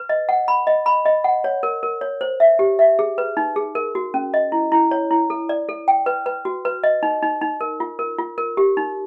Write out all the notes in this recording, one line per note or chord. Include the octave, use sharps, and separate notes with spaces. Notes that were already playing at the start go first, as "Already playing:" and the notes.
Already playing: B4
D#5
F#5
B5
D#5
B5
D#5
F#5
C#5
A#4
A#4
C#5
C5
E5
G4
E5
G#4
B4
D#4
G#4
A#4
F#4
C#4
D#5
E4
E4
C#5
E4
A4
D5
A4
G5
B4
B4
F#4
B4
D#5
D#4
D#4
D#4
A#4
F4
A#4
F4
A#4
G4
D#4